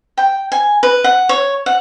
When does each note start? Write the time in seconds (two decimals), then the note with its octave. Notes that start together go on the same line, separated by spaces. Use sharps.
0.18 G5
0.52 G#5
0.83 B4
1.04 F#5
1.29 C#5
1.66 F#5